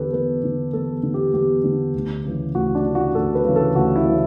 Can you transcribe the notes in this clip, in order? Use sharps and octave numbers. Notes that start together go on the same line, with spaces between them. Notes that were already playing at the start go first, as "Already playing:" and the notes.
Already playing: E2 D3 G4 A4 B4
E2 B4
D3
E2 A4
D3
G4
E2 G4
D3
D2
C#3 E3
D2 F#4
D4
C#3 E3
F#4
D2 A4
B4
C#3 E3
A4
D2 F#4
E4
C#3 E3